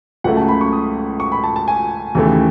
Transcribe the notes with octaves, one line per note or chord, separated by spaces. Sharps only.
C#2 C#3 F#3 A3 F#5
A5
B5
C#6
D#6
C#6
B5
A5
A5
G#5
D#2 C#3 E3 A3